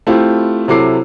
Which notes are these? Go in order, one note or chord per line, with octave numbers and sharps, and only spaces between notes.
A3 C4 E4 F4 G4
C3 F#3 E4 A4 D6 C7